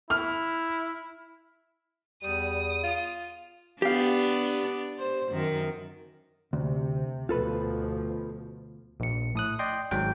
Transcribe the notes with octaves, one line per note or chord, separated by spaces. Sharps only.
E4 F6
E2 G3 D#6
F4
B3 D4 G4 F5
C5
F#2 D#3
D2 C3
D2 B2 F3 F4 A4 B4
A#1 C#7
A2 D#6 F#6
D5 D#5 G5 C6
G#1 G#2 F#3 G5